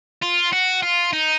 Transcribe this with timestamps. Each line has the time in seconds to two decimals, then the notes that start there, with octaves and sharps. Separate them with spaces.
0.22 F4
0.53 F#4
0.83 F4
1.13 D#4